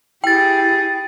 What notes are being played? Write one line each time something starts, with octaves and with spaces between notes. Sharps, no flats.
E4 G4 G#4 G5 A6